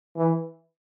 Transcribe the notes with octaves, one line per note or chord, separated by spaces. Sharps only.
E3